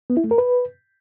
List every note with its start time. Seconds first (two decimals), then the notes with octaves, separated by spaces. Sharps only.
0.10 B3
0.17 E4
0.24 A3
0.31 A#4
0.38 B4